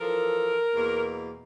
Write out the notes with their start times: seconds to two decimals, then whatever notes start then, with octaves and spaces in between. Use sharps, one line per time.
0.01 E3 F3 A4 A#4
0.75 E2 B2 A#3